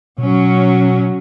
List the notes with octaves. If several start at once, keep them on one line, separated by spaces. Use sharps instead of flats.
B2 F#3 C#4